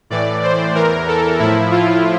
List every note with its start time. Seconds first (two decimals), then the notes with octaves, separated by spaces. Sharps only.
0.10 A2 E3 D5
0.43 C5
0.75 E2 E3 A#4
1.08 A4
1.39 A2 F3 E4
1.71 F4